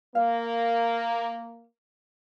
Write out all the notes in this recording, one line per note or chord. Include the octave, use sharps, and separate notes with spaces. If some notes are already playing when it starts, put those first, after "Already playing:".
A#3 F5